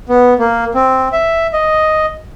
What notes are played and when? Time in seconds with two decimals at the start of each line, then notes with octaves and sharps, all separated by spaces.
0.09 B3
0.39 A#3
0.75 C4
1.12 E5
1.53 D#5